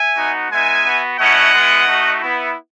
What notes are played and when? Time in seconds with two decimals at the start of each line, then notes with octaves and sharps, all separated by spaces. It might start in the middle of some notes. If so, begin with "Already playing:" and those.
Already playing: E5 G#5
0.17 B3 D#4 F#4
0.51 G#3 B3 D#4 E5 G#5
0.86 B3 F#4
1.19 A3 C#4 E4 D#5 F#5
1.53 G#3 B3 E4
1.88 A3 D#4 F#4
2.21 B3 E4